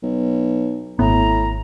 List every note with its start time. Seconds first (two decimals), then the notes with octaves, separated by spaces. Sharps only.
0.03 B1
0.99 G#1 A2 B3 A#5